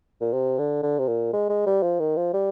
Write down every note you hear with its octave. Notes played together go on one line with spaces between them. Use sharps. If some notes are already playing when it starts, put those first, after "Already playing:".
A#2
C3
D3
D3
C3
A#2
G#3
G#3
G3
F3
D#3
F3
G3